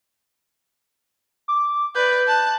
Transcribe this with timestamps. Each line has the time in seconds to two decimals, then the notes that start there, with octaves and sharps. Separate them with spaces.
1.48 D6
1.95 B4 D5 G6
2.27 A5 F#6